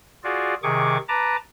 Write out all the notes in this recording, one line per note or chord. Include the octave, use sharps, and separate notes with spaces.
F4 F#4 G#4 D5
C3 D#3 G#4 C#6 D6
B4 A5 A#5 D6